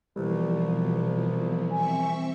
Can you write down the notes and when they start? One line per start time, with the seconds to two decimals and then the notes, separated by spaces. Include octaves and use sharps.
0.16 C2 B2 E3 F3 G3
1.71 C4 E5 G#5 C#6